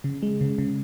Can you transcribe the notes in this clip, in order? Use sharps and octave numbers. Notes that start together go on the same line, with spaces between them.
C#3
G#3
C#3
C#3